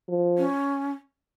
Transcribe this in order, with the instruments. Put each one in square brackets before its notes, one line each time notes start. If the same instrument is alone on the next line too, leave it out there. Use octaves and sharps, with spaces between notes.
[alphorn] F3
[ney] C#4